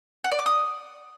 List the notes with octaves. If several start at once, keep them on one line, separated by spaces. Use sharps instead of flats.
F#5
D5
D6
D#6